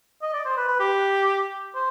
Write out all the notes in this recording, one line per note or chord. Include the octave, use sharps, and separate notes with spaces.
D#5
D5
C5
B4
B4
G4
C5